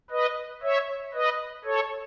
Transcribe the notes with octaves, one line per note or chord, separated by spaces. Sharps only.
B4 D#5
C#5 E5
B4 D#5
A4 C#5